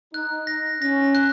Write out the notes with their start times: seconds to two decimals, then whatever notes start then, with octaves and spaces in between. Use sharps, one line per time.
0.14 D#4 F#6
0.47 A#6
0.81 C#4 A#6
1.15 F#6